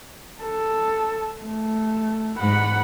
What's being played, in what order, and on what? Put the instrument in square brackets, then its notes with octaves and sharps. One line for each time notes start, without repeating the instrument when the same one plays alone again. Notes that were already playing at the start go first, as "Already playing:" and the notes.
[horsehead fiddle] A4
A3
[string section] G#2 [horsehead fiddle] F#5 B5